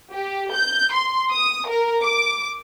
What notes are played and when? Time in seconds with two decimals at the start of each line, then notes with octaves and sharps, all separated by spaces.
0.12 G4
0.52 G6
0.92 C6
1.32 D#6
1.67 A#4
2.02 D6